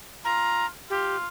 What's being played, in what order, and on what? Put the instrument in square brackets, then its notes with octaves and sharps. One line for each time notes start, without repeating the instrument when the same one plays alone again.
[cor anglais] F4 [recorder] A#5
[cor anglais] F4 [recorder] G4